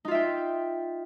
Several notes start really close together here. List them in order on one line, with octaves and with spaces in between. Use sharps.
D#4 F4 E5 G5